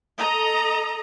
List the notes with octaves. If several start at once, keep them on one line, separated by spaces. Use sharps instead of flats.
A4 D#5 A#5